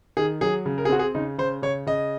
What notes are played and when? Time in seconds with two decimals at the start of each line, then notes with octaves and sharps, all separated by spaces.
0.17 D#3 G#4
0.41 F#3 G#4
0.66 C#3
0.78 A#4
0.85 G#4
0.89 C4 F#4
0.99 G#4
1.15 C#3 D#4
1.38 C#3 C5
1.62 C#3 C#5
1.87 C#3 D#5